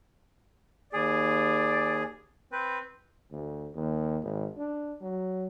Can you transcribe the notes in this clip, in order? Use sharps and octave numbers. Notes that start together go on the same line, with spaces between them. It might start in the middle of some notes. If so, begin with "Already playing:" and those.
D#2 G#4 D5
C4 B4
D2
D#2
G#1
D4
F#3